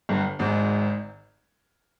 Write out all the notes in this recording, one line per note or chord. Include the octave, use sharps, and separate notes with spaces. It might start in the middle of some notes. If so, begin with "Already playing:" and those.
G1 G2
G#1 G#2